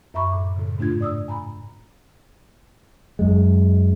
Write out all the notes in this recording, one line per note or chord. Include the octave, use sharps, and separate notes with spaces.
F#2 E5 A#5 B5 C#6
A2 D6
A2 C#3
G#2 A3 D4 F4 G#6
D5 D#6 E6
G#5 A#5 B5
F#2 G#3